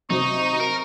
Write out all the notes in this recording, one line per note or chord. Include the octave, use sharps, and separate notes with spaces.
C3 F#3 D#4 C5 C#6
A#4